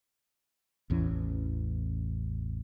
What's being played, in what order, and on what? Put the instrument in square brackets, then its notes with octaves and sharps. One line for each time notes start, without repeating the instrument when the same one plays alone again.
[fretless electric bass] A1 E2 E3 C#4